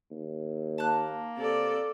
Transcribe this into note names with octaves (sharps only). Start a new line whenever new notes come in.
D#2
A#3 A5 F#6
C3 A4 D5